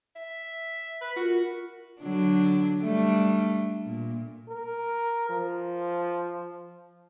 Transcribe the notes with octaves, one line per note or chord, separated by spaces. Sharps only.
E5
B4
F4 F#4 A#4
D3 F#3 D4
G3 A3 D4
A#2
A#4
F3